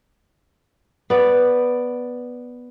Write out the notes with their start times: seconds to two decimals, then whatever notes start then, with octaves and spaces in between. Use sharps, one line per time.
1.10 B3 D5